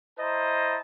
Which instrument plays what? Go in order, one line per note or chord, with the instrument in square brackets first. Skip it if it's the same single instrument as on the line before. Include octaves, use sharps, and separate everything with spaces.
[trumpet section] E4 C5 D#5 A5 A#5